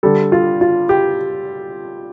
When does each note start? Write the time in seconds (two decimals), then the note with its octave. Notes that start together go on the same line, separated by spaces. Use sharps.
0.03 D3 G3 A4
0.32 F4
0.61 F4
0.89 G4